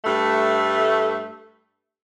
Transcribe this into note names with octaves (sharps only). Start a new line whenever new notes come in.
G2 A3